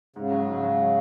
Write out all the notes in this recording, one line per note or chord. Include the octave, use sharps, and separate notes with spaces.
G#2 C#3
F#3
G#2
F#3